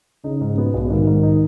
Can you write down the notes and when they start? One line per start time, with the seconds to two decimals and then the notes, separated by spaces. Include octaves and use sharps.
0.24 C#3 D#4
0.41 G#2
0.58 B2 B3
0.74 B1
0.90 G#2 D#3
1.07 G#2
1.23 D#4